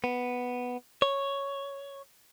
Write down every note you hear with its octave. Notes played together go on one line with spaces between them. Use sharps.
B3
C#5